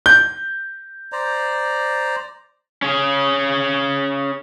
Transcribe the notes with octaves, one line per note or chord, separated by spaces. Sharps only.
G6
C5 D5 A#5
C#4 G#4